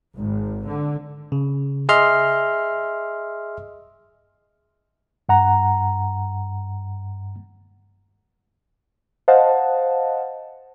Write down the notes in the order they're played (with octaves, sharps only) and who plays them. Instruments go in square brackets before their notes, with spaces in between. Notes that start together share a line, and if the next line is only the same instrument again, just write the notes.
[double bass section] G#1
D3
[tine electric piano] C#3
G#4 D#5 E5 C6 F6
[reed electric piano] G2 F#5 A#5
[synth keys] C5 D#5 F5 F#5 A5